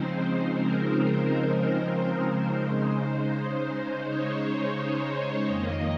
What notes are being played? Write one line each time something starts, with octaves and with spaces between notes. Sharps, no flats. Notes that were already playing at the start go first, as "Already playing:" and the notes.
Already playing: C#3 F3 G#3 C4 D#4 C5
A#4
A#4
C#3 G#3 D#4 C5
C#5
F2 D#3 A#3 D#5